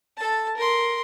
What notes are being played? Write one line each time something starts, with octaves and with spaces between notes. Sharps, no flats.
A4 A5
A#4 C6